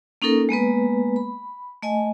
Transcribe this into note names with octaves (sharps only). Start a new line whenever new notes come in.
A#3 C#4 D#4 A4 A#4
G#3 A#3 B3 B4
B5
A3 D#5 G#5